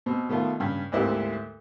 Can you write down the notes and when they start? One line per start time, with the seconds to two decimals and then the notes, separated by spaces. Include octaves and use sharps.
0.06 B2 C4
0.29 B2 D#3 A3 F4
0.60 G2 C#3
0.92 D2 G#2 A#3 C4 E4 G4